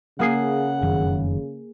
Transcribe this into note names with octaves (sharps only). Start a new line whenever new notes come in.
C#3 A#3 G#4 F#5 C7
F1 F#2 D#3